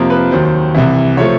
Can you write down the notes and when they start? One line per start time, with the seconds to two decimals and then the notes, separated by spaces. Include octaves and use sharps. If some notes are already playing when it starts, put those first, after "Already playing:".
Already playing: F2 C3 F3 A#3
0.10 B4
0.31 D#2 D#3 F#3 C5
0.74 C2 C3 E3
1.17 C3 F3 A3 C#5